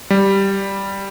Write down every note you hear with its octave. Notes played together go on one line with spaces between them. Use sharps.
G3